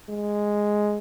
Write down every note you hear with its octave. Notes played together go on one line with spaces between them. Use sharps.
G#3